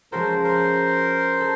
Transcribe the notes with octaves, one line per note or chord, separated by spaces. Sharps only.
F3 G#3 C#4 F#4 A4 A#4 C5
A#4 C5
A4